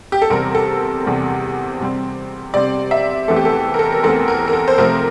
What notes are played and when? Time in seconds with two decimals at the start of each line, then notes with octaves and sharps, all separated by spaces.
0.12 G4
0.22 A4
0.30 E2 C3 G3 C4 A#4
0.55 A4
1.05 E2 C3 G3 C4
1.80 C3 G3 C4
2.54 C3 G3 C4 D5
2.91 E5
3.28 E2 E3 A3 C4 A4
3.36 G4
3.45 A4
3.74 A#4
3.79 A4
3.92 A#4
4.03 E2 E3 A3 C4 A4
4.28 A#4
4.48 A#4
4.53 A4
4.68 C5
4.78 C3 F3 A3 C4 A#4